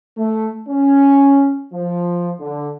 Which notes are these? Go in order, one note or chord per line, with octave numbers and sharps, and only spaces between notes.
A3
C#4
F3
D3